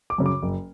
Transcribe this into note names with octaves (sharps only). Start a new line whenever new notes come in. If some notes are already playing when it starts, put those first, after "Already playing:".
D6
F#2 C#3
D6
F#1